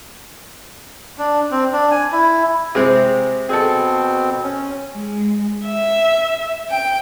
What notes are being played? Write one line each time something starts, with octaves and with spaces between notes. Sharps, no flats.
D4
C4
D4
G#5
E4
C3 G#3 C4
B2 C4 G#4 A4
C#4
G#3
E5
G5